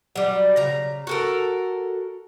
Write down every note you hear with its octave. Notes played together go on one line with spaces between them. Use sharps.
F#3 G3
C#3 A#5
F#4 A4 A#4